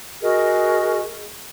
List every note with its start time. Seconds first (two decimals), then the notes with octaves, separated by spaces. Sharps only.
0.22 F#4 G#4 A#4 D#5